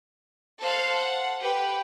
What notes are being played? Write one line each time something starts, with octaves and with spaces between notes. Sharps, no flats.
A4 C5 F5 C6 F#6
F#5
G4 B4 G5